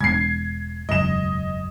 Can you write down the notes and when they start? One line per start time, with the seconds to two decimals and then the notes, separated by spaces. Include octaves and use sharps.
0.01 E1 G#6 C7
0.89 E1 C#2 F#2 D#5 E7